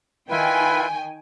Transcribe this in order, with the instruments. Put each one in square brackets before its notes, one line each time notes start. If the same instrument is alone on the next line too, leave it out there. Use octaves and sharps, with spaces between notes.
[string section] D#3 G5 G#5 [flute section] E4 F4 B4